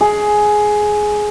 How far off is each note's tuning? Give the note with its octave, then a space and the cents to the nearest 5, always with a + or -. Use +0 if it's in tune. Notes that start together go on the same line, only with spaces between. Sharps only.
G#4 +10